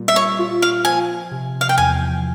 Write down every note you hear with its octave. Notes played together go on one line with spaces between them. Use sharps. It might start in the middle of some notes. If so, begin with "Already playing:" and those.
Already playing: A#2 G3 A#3
E5
C#5
F4
F5
F3 G#5
C3
F5
G5
E2 G#5